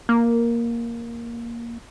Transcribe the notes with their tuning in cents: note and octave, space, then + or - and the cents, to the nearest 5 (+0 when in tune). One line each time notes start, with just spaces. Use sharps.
A#3 +5